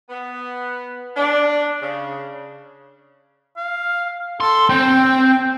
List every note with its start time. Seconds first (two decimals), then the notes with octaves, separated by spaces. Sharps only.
0.10 B3
1.17 D4
1.82 C#3
3.57 F5
4.41 A4 C6
4.70 C4 G5